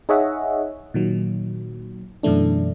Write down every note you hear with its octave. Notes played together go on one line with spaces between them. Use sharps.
D#4 G#4 C#5 D#5 E5 F#5
A#2 D#3 F#3
F#2 B2 E3 A3 D4